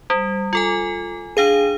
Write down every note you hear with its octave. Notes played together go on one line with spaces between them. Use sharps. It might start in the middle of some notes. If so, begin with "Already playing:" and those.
G3
F4 A4 G#5
D4 G#4 F5 D#7